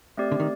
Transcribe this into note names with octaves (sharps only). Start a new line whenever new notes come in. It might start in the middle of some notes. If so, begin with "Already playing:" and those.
A3 C4 G4 D5
D3
D#3